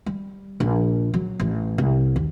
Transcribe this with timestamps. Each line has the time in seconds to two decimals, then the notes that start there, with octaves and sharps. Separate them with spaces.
0.06 G3
0.60 A#1
1.14 F#3
1.40 A1
1.78 C2
2.16 D#2